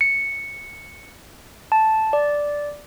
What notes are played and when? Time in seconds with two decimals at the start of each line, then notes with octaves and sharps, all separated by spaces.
0.01 C#7
1.72 A5
2.13 D5